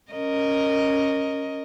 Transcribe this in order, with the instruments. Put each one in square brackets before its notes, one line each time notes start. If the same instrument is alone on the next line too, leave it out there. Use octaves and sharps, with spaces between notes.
[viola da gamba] C#4 A#4 D#5